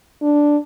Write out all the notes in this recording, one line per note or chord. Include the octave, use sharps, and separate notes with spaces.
D4